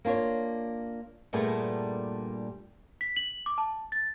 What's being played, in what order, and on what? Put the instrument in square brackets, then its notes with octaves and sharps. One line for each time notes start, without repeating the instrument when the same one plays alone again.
[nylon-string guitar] A#3 D4 F4 C#5
G2 A#2 G3 A3 B3 G#4
[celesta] B6
F#7
D6
A5
A6